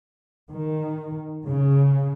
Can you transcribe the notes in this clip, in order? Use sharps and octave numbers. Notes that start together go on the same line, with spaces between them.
D#3
C#3